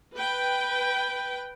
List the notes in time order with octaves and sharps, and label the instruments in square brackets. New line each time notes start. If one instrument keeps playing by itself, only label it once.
[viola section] B4 G5